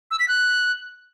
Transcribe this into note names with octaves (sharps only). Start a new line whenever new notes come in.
E6
B6
F#6